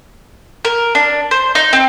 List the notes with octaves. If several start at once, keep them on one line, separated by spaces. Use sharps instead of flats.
A#4
D4
C5
D#4
C4